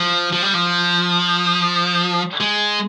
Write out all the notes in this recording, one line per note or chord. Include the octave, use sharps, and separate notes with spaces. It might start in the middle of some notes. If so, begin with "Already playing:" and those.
Already playing: F3
F3
G3
F3
G#3